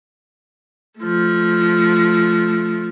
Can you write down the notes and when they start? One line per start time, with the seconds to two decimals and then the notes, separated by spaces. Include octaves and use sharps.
1.00 F3 A3